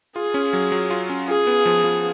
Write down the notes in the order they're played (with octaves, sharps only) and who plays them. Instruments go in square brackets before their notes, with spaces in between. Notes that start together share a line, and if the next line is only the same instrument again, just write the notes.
[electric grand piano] F4 [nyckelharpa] G#4
[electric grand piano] C#4
F#3
F#3
F4
C#4
[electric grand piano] F4 [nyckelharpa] G#4
[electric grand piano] B3
F3
F3